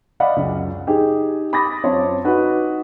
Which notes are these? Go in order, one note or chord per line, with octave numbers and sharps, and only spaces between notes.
D5 D#5 F5 F#5 B5
C#2 F#2
D#4 G4 G#4
B5 D6 D#6 A6 A#6
F#2 C4 F4 C#5 A5 C6
D#4 F#4 B4